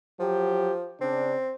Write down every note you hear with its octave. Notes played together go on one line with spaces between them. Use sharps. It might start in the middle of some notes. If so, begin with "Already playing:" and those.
F3 F#3 G4
C#3 C4 D4